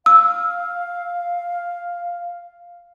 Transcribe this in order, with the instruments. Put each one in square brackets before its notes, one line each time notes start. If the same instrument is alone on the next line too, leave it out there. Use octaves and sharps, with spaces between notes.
[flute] F5 [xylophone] E6